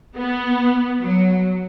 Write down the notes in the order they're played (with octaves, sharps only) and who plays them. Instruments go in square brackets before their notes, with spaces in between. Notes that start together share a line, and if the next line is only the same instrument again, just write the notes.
[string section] B3
F#3